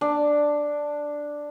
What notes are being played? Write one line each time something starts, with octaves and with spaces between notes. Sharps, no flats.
D4